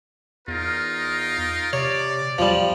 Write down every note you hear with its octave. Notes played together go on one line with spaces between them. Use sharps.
E2 D#4 F4 A#4
C3 C#5 D5
E2 F3 G3